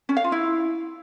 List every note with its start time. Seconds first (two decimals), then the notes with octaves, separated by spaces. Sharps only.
0.09 C#4
0.17 F5
0.24 F4
0.32 E4